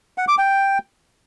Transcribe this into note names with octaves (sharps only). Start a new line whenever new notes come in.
F#5
D6
G5